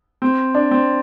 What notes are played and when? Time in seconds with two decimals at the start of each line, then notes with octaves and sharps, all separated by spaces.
0.22 C4
0.55 D4
0.71 C4